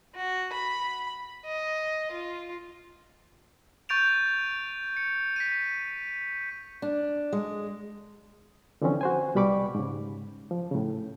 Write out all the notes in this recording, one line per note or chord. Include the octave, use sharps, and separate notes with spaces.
F#4
B5
D#5
F4
C#6 G6 A6 D7 F7
C#7
B6 D#7
D4
G#3
D3 E3 F3 C4 C#4
F#4 C5 G#5
C2 B2 G3 B5 C#6 D6
G#2 C#3
F3
A2 C#3